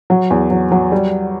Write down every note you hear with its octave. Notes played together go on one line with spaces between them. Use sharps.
F#3
E2
F#3
F#3
G3